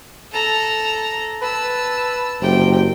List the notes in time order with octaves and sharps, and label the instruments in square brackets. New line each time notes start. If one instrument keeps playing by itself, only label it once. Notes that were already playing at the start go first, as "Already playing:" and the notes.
[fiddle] A4 A#5
[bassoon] B4 [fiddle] A5 E6
[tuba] F#1 [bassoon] C3 [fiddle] G5